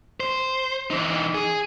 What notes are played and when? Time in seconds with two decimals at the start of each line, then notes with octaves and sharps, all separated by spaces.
0.20 C5
0.91 E3 D#4
1.35 G#4